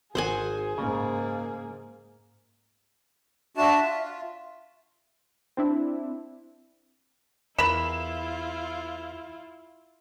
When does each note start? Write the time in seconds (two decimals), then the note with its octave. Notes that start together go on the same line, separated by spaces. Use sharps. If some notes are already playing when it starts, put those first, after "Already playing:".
0.15 G#1 F#4 G#4 C5 F#5 G#5
0.78 G#2 C#3 A#3
3.57 D4 F#4 E5 A5
3.82 F4
5.57 C4 D4 E4
7.59 E2 E4 F4 A#4 B5 E7